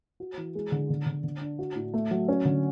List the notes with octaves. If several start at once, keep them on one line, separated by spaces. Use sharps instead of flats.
F#4
E3
G#3
D3
D3
D3
D3
D4
F#4
A2
A3
F#3
C#4
D3